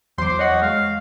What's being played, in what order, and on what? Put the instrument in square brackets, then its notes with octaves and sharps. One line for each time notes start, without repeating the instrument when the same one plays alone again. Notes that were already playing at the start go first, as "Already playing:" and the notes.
[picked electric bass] E2 [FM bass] F#3 [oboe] C5 [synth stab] C6 D6
[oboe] F#4 [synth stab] C#5 D#5 F#5
[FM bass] G#3 [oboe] F5